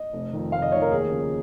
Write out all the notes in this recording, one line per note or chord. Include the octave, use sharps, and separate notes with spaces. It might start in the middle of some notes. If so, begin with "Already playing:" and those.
Already playing: D#5
F1
F2 D#3
F1 F5
D#5
F2 D#3 C#5
A#4
D#2 G#4
C#3 F3